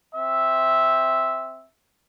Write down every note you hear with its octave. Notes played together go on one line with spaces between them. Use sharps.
C4 E5